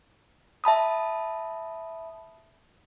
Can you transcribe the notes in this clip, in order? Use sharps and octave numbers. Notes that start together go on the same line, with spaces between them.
E5 A5 B5 D#6